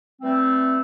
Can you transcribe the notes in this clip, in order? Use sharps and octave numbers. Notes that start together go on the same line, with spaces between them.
E3 G3 A3 C4